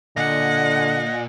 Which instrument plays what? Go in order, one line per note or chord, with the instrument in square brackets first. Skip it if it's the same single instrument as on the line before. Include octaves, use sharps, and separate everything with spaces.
[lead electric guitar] A#2 [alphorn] D3 [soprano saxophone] D#5 [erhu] F#5